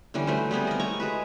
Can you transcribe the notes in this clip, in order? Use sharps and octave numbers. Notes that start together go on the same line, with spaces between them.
D3 E3 G3 C#4
F#3 A3 B4 C5
G3 B3 C4 G#4
A#4 D#5
A3 C#5 A#5 C#6
G#3 F#4 B4